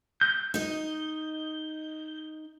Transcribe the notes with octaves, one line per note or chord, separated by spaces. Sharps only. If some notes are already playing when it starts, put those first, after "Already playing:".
G6
D#4 D#5